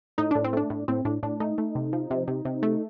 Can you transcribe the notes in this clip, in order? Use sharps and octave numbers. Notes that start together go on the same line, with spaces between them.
A2 D#4
A2 D4
C4
A3 D4
A2
A2 C4
A2 D4
A2 D4
A3 D#4
A3
C3
F3
C3
C3
C3
A3